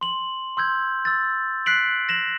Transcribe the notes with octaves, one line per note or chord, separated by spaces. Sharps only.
C6 F#7
C6 E6 G6 G#6
E6 A6
F#6 B6 C7 D7 F#7
A#6 E7 F#7